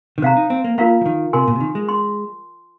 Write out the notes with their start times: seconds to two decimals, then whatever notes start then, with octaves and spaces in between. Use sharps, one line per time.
0.18 D#3
0.22 C3 C5 F5 A#5
0.37 D#4
0.50 C4
0.64 A#3
0.78 A#3 F4 A#4 F5 A#5
1.01 F3
1.06 D#3
1.33 C3 A#4 G#5 C6
1.48 A#2
1.55 C3
1.60 D#3
1.75 G#3
1.89 C6